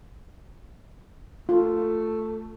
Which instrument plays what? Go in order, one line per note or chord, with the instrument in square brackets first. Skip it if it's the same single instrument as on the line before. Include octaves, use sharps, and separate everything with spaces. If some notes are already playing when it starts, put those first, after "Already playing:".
[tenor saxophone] A3 [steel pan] F4